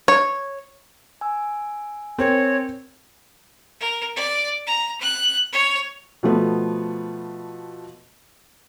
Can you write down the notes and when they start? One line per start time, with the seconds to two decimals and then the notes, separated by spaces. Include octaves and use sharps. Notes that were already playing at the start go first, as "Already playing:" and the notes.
0.08 C#5
1.21 G#5 E6
2.18 C4 A#4 C#5
3.80 A#4
4.16 D5
4.67 A#5
5.01 F#6
5.53 C#5
6.23 B2 F3 A3 B3